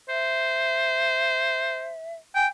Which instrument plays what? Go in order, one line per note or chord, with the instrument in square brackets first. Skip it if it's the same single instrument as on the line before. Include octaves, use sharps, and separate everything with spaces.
[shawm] C5 [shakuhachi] E5
[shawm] G5 [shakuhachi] G#5